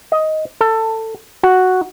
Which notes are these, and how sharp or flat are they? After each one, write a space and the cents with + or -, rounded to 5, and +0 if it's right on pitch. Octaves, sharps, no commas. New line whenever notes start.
D#5 +10
A4 +20
F#4 +0